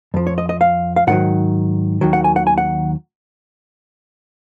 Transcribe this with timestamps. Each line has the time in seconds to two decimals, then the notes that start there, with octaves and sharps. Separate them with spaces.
0.14 F2 F3
0.27 C#5
0.38 D#5
0.49 D#5
0.61 F5
0.96 F5
1.07 G#2 D#3 F#3 F#5
2.01 D#2 D#3 F#3
2.13 F#5
2.24 G#5
2.36 F#5
2.47 G#5
2.58 F#5